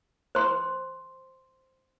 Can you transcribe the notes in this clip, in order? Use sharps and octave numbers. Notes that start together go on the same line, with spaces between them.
C5 C6